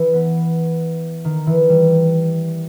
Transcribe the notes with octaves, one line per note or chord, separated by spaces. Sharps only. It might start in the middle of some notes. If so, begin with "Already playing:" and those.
Already playing: E3
B3
D#3
E3
G3